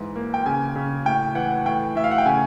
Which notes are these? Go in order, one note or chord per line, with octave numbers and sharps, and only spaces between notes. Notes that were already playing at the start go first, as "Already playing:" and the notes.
Already playing: G#2 E3
A#3
G5
C#3 G#5
C#3
A2 G5
E3 F#5
A2 G5
A2 E5
F5
F#5
G5
C#3 G#5